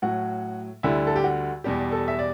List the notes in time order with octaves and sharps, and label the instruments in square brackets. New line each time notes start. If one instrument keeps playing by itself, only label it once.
[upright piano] A2 F#3 F#4
D2 D3 G3 E4
A4
G4
F#4
E2 B2 G3 G4
A4
E5
D5